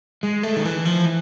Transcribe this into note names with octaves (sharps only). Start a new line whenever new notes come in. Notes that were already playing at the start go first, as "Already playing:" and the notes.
G#3
A3
D#3
E3
F3
E3